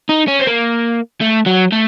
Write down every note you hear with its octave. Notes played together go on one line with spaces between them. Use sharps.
D#4
C#4
C4
A#3
A3
F#3
A3